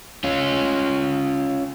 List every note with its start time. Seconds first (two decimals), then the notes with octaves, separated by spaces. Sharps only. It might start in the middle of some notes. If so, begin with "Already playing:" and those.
0.24 C#4 F4